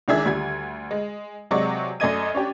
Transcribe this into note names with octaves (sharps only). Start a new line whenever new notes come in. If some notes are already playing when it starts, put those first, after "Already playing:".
C#2 D#3 D4 G#4 E5 G#6
D2 G3 G#6
G#3
C3 F#3 G#3 D5 F#5 C#6
F#2 A3 D5 D#5 G#6 D#7
C#4 D4 G4